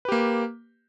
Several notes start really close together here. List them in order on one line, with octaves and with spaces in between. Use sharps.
B4 G4 A#3